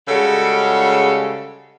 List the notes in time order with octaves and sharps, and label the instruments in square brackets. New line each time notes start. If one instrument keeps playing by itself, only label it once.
[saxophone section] C#3 G3 G#3 F#4 A4